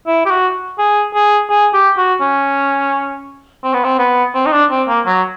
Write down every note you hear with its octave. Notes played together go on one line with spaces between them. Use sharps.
E4
G4
F#4
G#4
G#4
G#4
G4
F#4
C#4
C4
B3
C4
B3
C4
D#4
D4
C4
A#3
F#3